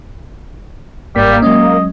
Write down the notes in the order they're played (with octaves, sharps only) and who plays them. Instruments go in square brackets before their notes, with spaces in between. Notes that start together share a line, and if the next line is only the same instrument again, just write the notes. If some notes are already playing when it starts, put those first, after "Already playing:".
[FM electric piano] G1 G#2 B6 [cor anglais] G3 [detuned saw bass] A#3
[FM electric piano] F#3 G#3 C#4 [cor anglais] D#5